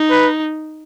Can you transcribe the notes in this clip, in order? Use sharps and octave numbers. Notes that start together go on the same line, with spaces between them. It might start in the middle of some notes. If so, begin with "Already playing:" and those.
Already playing: D#4
B4